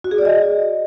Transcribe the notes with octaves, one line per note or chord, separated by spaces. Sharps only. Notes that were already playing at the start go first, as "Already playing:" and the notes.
F#4
G#4
D5
D#5